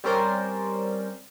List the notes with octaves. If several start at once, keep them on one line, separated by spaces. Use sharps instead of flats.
G3 C4 C#4 A#4 C5 D5